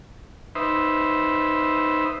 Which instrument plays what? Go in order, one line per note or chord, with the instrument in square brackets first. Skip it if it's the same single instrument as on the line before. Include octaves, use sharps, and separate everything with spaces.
[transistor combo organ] D#4 B4 C5 E5